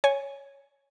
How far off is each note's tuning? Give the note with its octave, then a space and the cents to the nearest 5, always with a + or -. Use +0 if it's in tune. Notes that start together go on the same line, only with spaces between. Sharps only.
C#5 +0 G#5 +0